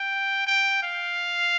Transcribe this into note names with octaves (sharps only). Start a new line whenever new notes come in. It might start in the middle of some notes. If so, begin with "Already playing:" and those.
Already playing: G5
G5
F5